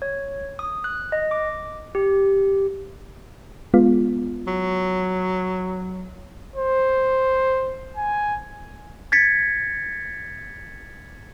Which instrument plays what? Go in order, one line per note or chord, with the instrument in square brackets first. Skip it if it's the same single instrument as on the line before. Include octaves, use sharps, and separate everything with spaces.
[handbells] C#5
D#6
F#6
D#5
D6
G4
[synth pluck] G#3 B3 F4
[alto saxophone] F#3
[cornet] C5
G#5
[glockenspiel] G#6 A6 B6 C#7